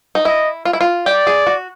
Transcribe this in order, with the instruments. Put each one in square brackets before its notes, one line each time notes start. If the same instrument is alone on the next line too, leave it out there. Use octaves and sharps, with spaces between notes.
[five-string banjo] D#4
[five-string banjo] E4 [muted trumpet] D#5
[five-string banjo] F4
E4
F4
[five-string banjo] G4 [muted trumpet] D5
[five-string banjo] G#4
F#4